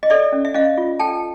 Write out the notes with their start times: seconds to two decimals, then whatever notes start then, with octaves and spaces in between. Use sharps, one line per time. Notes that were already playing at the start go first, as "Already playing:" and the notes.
0.03 D#5
0.10 A4 D5 E5
0.32 C#4
0.45 E5
0.54 C#4 D#5 F5
0.78 F4
0.99 A4 G5 A5